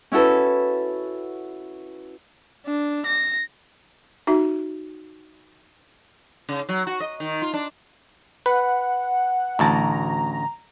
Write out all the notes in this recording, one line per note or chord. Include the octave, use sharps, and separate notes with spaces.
C#4 E4 F#4 A4 B4
D4
A#6
D#4 F#4 E5
C#3
F#3
F#4
D#5
D#3
F4
D4
B4 F#5
A1 D2 A5 A#5